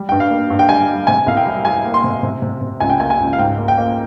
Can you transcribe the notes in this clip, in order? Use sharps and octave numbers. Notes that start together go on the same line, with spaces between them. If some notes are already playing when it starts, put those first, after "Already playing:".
Already playing: G3
G2 G5
F5
A#3
G2
G5
G3 G#5
G3
C3 G#5
C2 F5
G5
G3
G3 G#5
A#3
C6
C3
C3
C3
C3
C#2 G#5
G5
A#3 G#5
G#5
C#2
F5
G#2 G5
A#3
G5
A#3